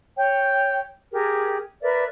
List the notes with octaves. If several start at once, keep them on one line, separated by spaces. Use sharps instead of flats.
C#5 G5
G4 G#4 A#4
A#4 B4 D5 E5